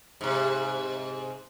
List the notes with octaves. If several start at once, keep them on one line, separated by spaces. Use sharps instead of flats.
G#2 C3